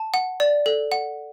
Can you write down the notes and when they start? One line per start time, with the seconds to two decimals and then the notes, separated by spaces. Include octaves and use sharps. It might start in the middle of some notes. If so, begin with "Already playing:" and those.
Already playing: A5
0.14 F#5
0.40 D5
0.66 A4
0.92 F#5